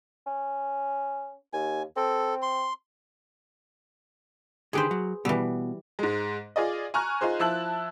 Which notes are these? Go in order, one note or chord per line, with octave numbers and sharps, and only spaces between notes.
C#4
D#2 G#5
C4 A4
C6
D3 D#3 G4 G#4 B4 C5
F#3
B2 E3 G3
G#2 G#3
F4 G#4 D5 D#5
G#5 A#5 C#6 F6 F#6
D#4 F4 G#4 C5
F3 E4 A5 E6 F#6 F#7